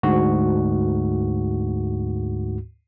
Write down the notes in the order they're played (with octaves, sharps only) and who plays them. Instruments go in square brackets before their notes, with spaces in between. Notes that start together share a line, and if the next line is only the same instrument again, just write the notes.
[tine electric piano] D2 G#2 F#4